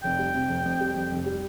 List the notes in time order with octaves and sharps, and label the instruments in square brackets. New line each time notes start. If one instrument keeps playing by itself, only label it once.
[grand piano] F1 [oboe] G5
[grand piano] G3
C3
F1
F2
G3
F2
F1
G3